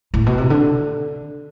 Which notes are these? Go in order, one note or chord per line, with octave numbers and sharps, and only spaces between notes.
A2
B2
C3
D3